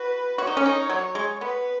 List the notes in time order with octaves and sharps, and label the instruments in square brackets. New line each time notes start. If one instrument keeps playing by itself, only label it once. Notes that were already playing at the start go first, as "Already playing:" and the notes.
Already playing: [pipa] F#4 [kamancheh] B4
[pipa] F#4 [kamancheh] C#5
[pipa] D#4
C#4
D#4
F#3
G#3
[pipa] B3 [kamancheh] B4